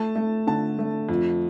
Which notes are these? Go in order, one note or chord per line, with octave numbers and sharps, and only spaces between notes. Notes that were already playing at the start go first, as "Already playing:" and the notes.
Already playing: A3 A5
A3
D3 A5
A3
F2